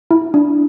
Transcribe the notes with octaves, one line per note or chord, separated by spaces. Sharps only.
E4
D4